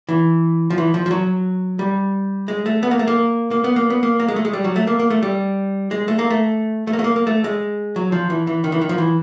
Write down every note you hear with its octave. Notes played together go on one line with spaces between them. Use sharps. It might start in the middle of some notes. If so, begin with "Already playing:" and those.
E3
F3
E3
F3
F3
F#3
G3
G#3
A3
B3
A#3
A3
A#3
A#3
B3
A#3
B3
A#3
A#3
G#3
A3
G#3
G3
F#3
A3
A#3
A#3
A3
G3
G#3
A3
A#3
A3
A3
A#3
A3
A#3
A#3
A3
G#3
F#3
F3
E3
E3
D#3
E3
D#3
F3
E3